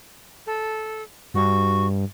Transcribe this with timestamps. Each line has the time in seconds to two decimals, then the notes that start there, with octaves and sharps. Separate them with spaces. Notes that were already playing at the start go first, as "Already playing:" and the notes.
0.47 A4
1.34 G2 F#4